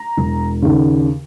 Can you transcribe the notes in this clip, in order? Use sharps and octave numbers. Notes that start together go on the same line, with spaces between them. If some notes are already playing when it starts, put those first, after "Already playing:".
Already playing: A#5
E1
D#2 C#3